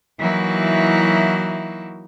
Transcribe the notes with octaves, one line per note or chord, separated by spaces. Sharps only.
E3 F#3 A#3 D#4 E4 F#4